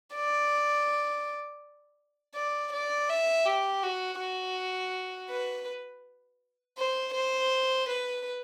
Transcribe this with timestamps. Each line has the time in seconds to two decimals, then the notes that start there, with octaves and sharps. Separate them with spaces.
0.15 D5
2.35 D5
2.73 D5
3.09 E5
3.45 G4
3.83 F#4
4.20 F#4
5.30 B4
6.78 C5
7.14 C5
7.89 B4